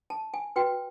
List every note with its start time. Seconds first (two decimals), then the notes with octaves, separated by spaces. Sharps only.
0.10 A5
0.34 G#5
0.56 F#4 B4 G5